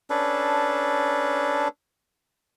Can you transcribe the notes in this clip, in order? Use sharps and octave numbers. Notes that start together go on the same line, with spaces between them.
C#4 D4 A4 B4